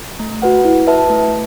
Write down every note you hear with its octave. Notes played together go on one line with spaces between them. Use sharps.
A3
F#4 B4 F#5
E4
B4 E5 A5
A3